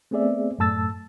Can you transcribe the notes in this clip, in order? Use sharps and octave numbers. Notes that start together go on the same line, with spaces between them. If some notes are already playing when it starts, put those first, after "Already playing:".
A3 B3 C4 G#4 D5 E5
F#2 A2 A3 A5 E6 A6